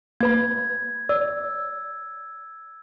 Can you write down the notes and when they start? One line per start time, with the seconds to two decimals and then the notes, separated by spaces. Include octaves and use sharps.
0.21 A#3 B4 B5 G#6
1.09 C#5 D5 E6